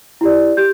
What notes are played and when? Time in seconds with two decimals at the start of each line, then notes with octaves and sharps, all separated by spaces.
0.21 E4 G4 D5
0.57 G4 G6